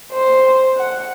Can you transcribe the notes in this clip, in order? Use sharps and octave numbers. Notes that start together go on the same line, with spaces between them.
C5
F#5